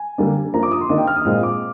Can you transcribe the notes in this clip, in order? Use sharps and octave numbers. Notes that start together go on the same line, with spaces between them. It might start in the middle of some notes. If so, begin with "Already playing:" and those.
Already playing: G#5
D3 G3 A#3 D4
F3 A#3 D4 A#5
D6
D#6
C6
D#3 A#3 D4 D#5
G5
F6
D#6
A#2 G#3 C4
D6